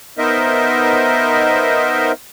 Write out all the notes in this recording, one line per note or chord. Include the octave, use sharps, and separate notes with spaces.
B3 D#4 A#4 C5 D#5 E5